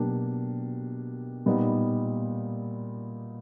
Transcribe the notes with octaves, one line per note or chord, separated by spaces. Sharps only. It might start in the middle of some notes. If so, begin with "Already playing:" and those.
Already playing: B2 F#3 A#3 D4 G4
A#2 G3 B3 D#4